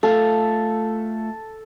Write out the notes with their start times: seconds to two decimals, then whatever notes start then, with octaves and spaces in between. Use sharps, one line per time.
0.03 A3 F4 A4 F5